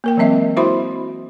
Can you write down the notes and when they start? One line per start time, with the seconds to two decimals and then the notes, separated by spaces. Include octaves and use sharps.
0.04 A#3 A#4 G5
0.17 E3 F#3 G#3 C4 D#5 E5
0.57 E4 F#4 C5 E5 B5 C6